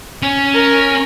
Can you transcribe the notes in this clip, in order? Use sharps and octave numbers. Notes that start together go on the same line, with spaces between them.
C#4
A#4